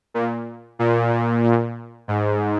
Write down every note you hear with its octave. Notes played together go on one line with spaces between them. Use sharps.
A#2
A#2
A#2
A#2
G#2